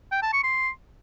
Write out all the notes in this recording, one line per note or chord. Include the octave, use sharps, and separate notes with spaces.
G5
A5
C#6
C6